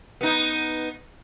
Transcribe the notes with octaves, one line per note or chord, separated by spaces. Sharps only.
B3 D#4